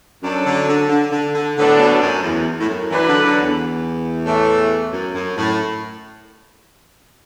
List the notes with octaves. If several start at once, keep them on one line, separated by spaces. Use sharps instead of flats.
F#2 F#3 D4 A4
D3
D3
D3
D3
D3
A2 D3 F#3 B3 D4 A4
B2
F#2
E2
A2
F#2
E3 F#3 D4 B4
D3
D3
E2
A2 E3 A3
F#2
F#2
A2